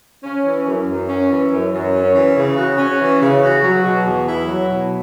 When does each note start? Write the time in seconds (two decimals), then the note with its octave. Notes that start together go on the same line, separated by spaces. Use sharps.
0.24 C#4
0.45 E3
0.66 F#2
0.88 F#2
1.08 C#4
1.30 E3
1.51 F#2
1.72 F#2
1.93 C#4
2.14 E3
2.36 C#3
2.56 F#4
2.78 C#4
3.00 E3
3.20 C#3
3.42 F#4
3.63 F#3
3.83 B2
4.05 E2
4.27 E4
4.47 F#3
4.68 B2